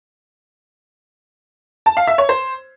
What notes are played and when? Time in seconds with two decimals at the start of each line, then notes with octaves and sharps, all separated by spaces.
1.86 A5
1.97 F5
2.08 E5
2.18 C#5
2.29 C5